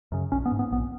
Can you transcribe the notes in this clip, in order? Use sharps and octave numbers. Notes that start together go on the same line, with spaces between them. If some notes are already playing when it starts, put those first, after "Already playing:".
F#2 C#3
A#1 C#4
B3
G#2
B3
A#1 B3